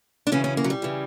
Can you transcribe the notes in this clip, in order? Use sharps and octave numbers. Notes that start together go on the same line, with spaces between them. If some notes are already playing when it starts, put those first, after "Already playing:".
D4
F#2 C#3 E3 C#4
C#4
A#3
F#3
G3
C#3 E3